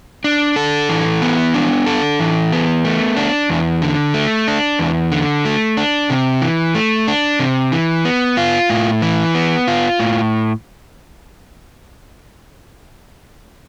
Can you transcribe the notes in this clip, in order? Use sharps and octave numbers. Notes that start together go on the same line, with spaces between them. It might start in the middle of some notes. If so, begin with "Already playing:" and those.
D4
A4
E3
B3
D4
A4
E3
B3
A3
D4
E2
D3
A3
D4
E2
D3
A3
D4
C3
E3
A3
D4
C3
E3
B3
F4
A2
E3
B3
F4
A2